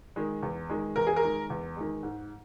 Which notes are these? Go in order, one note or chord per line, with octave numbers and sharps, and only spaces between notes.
D#3 G#3
E2
D#3 G#3
E2 A#4
G#4
A#4
D#3 G#3
E2
D#3 G#3
G#2